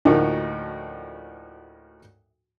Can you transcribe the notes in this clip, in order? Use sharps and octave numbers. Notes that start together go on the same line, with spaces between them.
D2 A2 F3 A#3 D#4 F#4